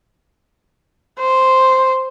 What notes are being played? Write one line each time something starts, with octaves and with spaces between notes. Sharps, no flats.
C5